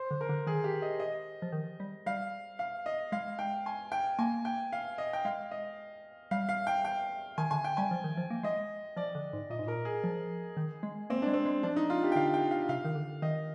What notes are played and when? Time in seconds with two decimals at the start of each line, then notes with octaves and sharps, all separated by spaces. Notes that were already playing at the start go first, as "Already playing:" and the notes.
Already playing: C5
0.11 D3
0.21 A#4
0.29 D3
0.47 D#3 G#4
0.64 G4
0.82 D#5
1.00 D#5
1.42 F3
1.52 D#3
1.80 G3
2.06 G3 F5
2.59 F5
2.86 D#5
3.12 G#3 F5
3.39 G5
3.66 G#5
3.92 G5
4.19 A#3 G#5
4.45 G5
4.73 F5
4.98 D#5
5.13 G5
5.25 G#3 F5
5.51 D#5
6.31 G3 F5
6.49 F5
6.67 G5
6.85 G5
7.38 D#3 G#5
7.51 D3 G#5
7.64 G5
7.77 G3 G#5
7.91 F3
8.04 D#3
8.17 F3
8.30 A#3
8.43 G#3 D#5
8.97 F3 D5
9.15 D3
9.33 G#2
9.50 A#2 D#5
9.59 G#2
9.67 A#2 A#4
9.85 G#4
10.04 F3
10.57 D#3
10.83 G#3
11.10 A#3 C4
11.22 G#3 D4
11.33 C4
11.45 G#3
11.63 F3 D4
11.76 D#4
11.90 F4
12.03 G4
12.12 G5
12.15 D3 F5
12.34 G5
12.51 F5
12.69 C3 F5
12.85 D#3
12.95 D3
13.22 D#3 D#5